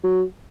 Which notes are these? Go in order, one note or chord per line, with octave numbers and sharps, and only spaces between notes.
F#3